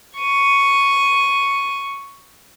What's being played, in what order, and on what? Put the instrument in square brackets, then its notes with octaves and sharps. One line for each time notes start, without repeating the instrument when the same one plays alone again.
[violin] C#6 D#7